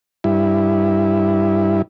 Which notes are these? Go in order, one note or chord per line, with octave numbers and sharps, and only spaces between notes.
G2 E4